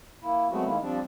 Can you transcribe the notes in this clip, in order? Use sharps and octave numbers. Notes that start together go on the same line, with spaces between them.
A#3 E4
F#3 G#3 A3 B3 C4 F#4
D#3 G#3 A#3 E4
F3 G3 C4 D4